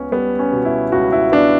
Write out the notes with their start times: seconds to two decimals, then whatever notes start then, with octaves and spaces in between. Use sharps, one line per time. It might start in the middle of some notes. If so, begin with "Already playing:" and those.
Already playing: C#2 B3 C#4
0.12 G3 B3
0.39 C#4
0.52 B2
0.65 E4
0.92 C#2 F#4
1.12 E4
1.32 B3 D4